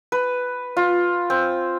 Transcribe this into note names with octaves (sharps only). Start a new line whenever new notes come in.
B4
F4
C4